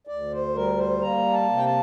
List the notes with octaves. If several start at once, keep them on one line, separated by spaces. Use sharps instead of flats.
D2 D5
C5
G3 A#4
C5
A#3 A#5
A5
C3
G5
A5